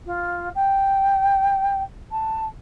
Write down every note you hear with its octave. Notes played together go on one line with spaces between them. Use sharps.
F4
G5
A5